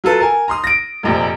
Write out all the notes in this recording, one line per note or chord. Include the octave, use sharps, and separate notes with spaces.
F#3 F4 A4 B4
A#4 G#5
A#5 C6 D#6
A#6 D7
F1 A#1 C3